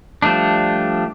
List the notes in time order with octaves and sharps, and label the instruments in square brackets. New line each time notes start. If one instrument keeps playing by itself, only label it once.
[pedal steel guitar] F3 G3 A3 D4